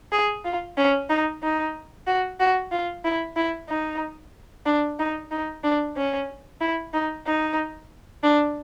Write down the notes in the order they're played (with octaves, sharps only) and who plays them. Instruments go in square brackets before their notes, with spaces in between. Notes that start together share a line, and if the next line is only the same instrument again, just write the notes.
[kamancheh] G#4
F4
C#4
D#4
D#4
F#4
F#4
F4
E4
E4
D#4
D4
D#4
D#4
D4
C#4
E4
D#4
D#4
D4